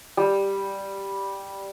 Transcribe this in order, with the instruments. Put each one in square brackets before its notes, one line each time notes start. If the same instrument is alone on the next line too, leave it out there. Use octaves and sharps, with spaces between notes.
[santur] G3